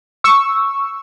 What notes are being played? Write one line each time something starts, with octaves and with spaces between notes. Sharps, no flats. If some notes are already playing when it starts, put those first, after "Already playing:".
C#6 E6